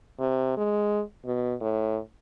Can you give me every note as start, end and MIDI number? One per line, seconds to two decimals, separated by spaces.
0.20 0.54 48
0.57 1.02 56
1.25 1.54 47
1.61 1.99 45